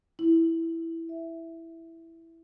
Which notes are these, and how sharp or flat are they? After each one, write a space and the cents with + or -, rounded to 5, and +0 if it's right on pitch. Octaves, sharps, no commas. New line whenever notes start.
E4 +0
E5 +5